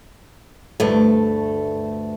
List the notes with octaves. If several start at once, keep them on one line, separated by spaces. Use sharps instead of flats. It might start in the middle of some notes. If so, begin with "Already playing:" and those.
D2 G2 A3